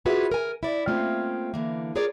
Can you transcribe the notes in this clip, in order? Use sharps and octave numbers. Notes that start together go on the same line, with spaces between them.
F4 F#4 G#4 B4 C#5 E5
A#4 G#5
E4 D5
A3 A#3 C4 C#4 F4
D3 E3 A#3
F4 G#4 A#4 C#5 D5